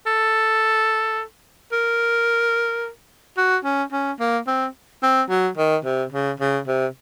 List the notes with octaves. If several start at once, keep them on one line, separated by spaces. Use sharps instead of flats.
A4
A#4
F#4
C#4
C#4
A#3
C4
C4
F#3
D#3
C3
C#3
C#3
C3